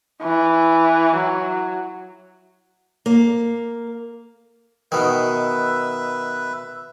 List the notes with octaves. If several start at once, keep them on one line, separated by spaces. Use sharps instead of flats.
E3
F#3
A#3
B2 D#3 B4 E5